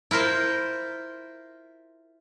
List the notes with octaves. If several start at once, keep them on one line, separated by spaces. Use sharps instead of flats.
E4 F4 A#4 C5